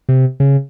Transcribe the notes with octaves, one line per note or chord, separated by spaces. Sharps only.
C3
C#3